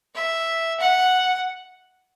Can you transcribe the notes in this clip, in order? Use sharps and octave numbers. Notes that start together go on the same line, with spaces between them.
E5
F#5